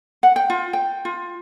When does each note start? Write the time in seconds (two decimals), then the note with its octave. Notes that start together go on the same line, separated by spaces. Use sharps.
0.23 F#5
0.36 G5
0.50 F4
0.73 G5
1.05 F4